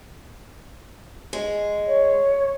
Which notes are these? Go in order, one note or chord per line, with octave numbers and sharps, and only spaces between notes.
G#3
C#5